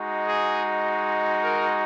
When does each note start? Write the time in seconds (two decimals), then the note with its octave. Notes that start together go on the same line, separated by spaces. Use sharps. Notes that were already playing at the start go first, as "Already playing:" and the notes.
Already playing: G#3 D#4 F#4
0.27 G#4
1.43 A#4